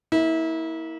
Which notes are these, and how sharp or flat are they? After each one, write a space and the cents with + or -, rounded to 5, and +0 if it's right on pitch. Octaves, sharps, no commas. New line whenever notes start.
A#3 +0 E4 -30